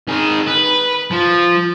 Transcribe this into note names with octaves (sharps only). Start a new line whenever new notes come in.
D#3 G#4
B4
F3